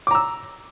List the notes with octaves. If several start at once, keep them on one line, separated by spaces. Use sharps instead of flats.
A#5 D6 E6